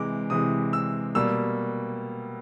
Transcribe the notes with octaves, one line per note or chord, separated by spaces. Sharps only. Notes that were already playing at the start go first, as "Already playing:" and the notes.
Already playing: C3 E3 G#3 D6
C3 E3 G#3 D#6
E6
B2 G3 A#3 E6